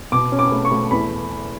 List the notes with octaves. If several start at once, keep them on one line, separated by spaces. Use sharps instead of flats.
B2 D6
C#4
D6
A3
C#6
A3
E2 B5